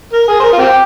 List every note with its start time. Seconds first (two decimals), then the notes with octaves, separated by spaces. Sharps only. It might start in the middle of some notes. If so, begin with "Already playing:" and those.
0.13 A#4
0.28 G#4
0.40 C5
0.43 A#4
0.53 F4
0.58 C4 G4